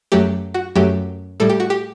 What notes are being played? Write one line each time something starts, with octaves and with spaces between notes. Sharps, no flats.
F#2 F#3 A3 G4
F#4
F#2 F#3 A3 G4
A2 G3 A4
G4
F#4
G4